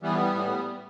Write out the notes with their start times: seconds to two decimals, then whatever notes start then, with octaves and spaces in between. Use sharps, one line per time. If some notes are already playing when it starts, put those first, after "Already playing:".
0.03 A2 E3 G3 B3
0.35 A2 E3